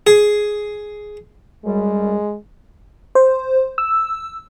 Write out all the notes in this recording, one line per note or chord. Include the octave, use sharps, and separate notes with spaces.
G#4
F#2 G3 G#3
C5
E6